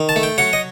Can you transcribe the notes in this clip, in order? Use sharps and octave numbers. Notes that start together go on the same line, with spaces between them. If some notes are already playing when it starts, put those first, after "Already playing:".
Already playing: D#3
A5
A3
G5
F#3 F#5
D#5